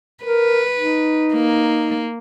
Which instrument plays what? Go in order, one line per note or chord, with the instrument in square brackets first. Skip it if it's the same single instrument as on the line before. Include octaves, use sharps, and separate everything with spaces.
[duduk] A#4 [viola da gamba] B4
[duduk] D#4
[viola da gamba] A#3